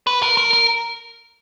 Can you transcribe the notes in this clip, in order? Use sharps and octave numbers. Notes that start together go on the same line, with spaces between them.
B4
A#4
A#4
A#4